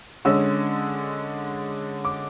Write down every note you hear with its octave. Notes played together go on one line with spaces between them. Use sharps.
D3 G#3 C#4 E6
D6